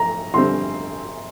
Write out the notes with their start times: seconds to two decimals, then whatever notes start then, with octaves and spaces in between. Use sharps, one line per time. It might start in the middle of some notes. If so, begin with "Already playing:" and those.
Already playing: A#5
0.34 D3 G3 C4 C6